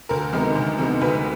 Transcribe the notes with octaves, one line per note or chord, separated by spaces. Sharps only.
D2 A#4
C3 D#3 G#3 B3
D2
C3 D#3 G#3 B3
D2 B4